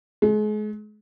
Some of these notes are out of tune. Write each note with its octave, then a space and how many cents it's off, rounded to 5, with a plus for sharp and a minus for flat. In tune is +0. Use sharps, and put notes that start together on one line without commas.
G#3 +35